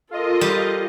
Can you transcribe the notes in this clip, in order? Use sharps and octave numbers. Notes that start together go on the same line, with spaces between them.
F4 A4 A#4 D#5
G3